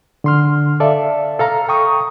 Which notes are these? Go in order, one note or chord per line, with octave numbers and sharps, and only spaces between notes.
D3 C6 F6
A4 D5 E5 F5 A5
A4 F5 A#5
G5 A#5 C#6 D#6